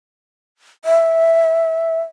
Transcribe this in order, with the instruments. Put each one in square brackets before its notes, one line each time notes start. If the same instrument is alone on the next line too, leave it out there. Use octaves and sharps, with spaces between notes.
[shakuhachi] E5